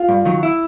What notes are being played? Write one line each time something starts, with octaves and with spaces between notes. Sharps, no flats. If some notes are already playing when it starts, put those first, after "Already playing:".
Already playing: F4
G2
D#3 F#3
E4